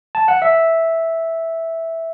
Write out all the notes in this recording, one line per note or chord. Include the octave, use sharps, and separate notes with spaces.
A5
F#5
E5